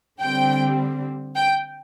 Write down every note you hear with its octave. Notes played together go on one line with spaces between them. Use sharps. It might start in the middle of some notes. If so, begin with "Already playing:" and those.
D3 G3 C4 G5
G5